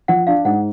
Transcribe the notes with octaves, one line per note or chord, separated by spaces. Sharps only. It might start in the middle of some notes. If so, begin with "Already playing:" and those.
F3 F#5
D4 F5
G#2 F#5